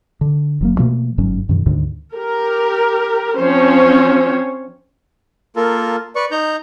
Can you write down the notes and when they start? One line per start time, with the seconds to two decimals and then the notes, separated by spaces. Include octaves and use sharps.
0.21 D3
0.61 F1 F#3 A#3
0.79 B2 F3 A3 A#3
1.18 G1 G#2 F#3 C#4
1.49 F#2 B2 D#3
1.66 D2 G#2 D3 D#3
2.14 G4 A#4
3.38 F3 C4 C#4 C5 C#5
5.56 A#3 F4 A4 A#4
6.16 B4 D5 C#6
6.31 D#4 A#5 G6